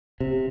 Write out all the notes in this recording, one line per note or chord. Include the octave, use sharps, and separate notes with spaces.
C3